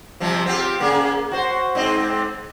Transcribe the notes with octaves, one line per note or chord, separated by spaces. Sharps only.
C3 F3 G3
C4 F4 G4
C#3 A#3 G#4
F#4 C5
G#2 C4 D#5